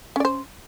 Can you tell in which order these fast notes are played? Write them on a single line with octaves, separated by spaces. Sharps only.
C#4 D5 C5